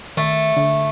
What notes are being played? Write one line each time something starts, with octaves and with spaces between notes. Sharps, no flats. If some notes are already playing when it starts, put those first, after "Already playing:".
D#3 A3
D3